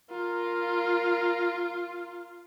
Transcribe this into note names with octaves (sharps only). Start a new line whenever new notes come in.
F4 A#4